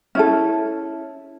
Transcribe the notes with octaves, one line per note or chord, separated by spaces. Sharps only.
C#4 E4 A4